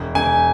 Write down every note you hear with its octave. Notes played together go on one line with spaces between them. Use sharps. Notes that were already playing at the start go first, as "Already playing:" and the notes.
Already playing: E1
E1 G#5